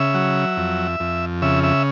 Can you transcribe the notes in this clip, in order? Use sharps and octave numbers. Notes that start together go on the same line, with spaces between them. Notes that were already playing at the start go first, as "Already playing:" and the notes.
Already playing: C#3 E5
F#3
F2
F2
C#3 E5
E5